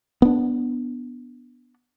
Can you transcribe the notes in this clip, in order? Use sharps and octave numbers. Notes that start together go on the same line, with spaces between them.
B3 D4